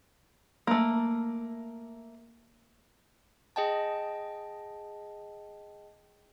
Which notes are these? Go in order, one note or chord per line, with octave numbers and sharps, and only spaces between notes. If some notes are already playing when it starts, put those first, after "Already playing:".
A3 A#3
G#4 D#5 G5 A5